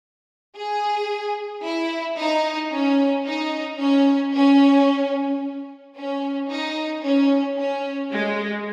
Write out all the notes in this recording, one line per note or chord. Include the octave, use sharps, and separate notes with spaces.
G#4
E4
D#4
C#4
D#4
C#4
C#4
C#4
D#4
C#4
C#4
G#3